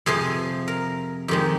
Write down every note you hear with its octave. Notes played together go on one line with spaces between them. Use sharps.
F2 C3 F3 G#4
A#4
F2 D#3 G#3 G4